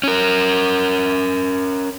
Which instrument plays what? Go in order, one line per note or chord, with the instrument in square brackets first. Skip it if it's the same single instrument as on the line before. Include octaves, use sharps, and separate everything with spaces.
[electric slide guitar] C#4 A#4